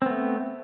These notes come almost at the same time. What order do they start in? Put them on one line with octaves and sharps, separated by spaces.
C4 B3 A3